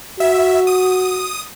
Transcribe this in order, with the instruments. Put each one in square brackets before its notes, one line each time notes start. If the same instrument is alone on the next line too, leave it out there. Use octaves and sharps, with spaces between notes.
[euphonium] F#4 [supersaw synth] E5
[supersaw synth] D#6